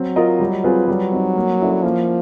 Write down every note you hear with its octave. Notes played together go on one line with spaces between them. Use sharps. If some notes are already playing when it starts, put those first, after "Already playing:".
Already playing: F#3 C4
F4 A#4 D#5
G3
C4 F4 G#4 B4
F#3 G3
C4 D#4
A#3
C#4 E4 A4 D5
F3 A#3